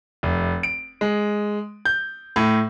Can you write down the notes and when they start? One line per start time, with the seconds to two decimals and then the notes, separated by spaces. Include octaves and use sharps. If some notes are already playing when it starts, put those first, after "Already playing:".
0.23 F1
0.63 D7
1.01 G#3
1.85 G6
2.36 A2